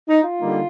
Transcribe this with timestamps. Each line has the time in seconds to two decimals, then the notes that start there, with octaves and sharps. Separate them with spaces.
0.09 D#4
0.24 F4
0.39 D3 G3 A#3 D#4